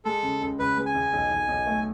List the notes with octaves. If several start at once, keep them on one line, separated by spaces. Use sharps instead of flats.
G#3 A4
C#3
C#2
C#2 B4
G#3
G#5
C#2
B1
B1
B1
A3